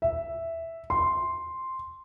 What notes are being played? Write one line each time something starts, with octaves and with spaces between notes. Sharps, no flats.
E5
C6